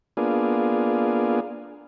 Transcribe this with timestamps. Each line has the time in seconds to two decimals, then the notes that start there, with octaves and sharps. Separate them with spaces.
0.17 A#3 B3 D4 F4 G#4